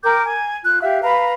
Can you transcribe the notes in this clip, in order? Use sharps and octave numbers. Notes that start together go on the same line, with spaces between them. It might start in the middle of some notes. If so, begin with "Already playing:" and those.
A#4 G5 D6 G6
G#5
F4 F#6
G4 E5 F5
B4 F5 A#5 B5